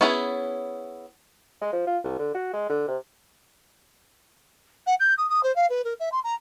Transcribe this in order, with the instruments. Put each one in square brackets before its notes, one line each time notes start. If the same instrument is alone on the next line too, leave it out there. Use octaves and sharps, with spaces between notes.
[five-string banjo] B3 C#4 E4 G#4
[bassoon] G#3
F3
F4
C2
D3
F#4
G#3
D3
C3
[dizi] F#5
G6
D#6
D#6
C5
F5
B4
A#4
E5
C6
A#5